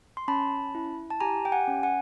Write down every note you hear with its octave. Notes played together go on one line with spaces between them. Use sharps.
C6
C#4 A5 B5
E4
A5
G4 G#5 A#5
G5
F#5 G#5
C#4
F#5 G#5